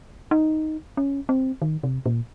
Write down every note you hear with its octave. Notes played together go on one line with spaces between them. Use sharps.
D#4
C#4
C4
D#3
C3
A#2